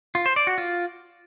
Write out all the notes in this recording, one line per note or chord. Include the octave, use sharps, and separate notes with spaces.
F4
C5
D5
F#4
F4